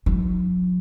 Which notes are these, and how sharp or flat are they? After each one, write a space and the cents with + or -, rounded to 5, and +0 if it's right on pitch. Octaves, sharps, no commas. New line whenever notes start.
F#3 -40 D#4 +0